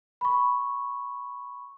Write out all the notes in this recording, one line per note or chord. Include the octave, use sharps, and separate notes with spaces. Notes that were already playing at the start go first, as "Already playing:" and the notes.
B5 C#6